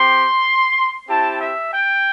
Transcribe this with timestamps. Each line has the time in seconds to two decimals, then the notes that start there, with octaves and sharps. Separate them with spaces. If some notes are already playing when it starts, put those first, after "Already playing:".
Already playing: C4 G4 C6
1.08 C4 E4 G4 A5
1.40 E5
1.71 G5